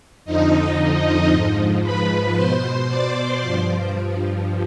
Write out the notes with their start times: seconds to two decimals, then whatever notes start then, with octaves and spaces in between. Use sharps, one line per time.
0.25 F2 D3 F3 D#4 D#5
1.30 G#2 F3
1.83 B4 B5
2.35 B2 C5 C6
2.87 D5 D6
3.40 G2 F3